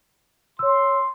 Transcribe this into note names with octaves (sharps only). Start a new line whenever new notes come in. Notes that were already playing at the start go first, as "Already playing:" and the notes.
C#5 C6 E6